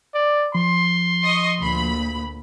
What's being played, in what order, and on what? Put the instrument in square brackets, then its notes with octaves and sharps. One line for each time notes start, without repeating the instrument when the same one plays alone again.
[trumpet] D5
[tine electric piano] F3 [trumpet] C6
[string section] D#5 C#6
D2 A#2 B5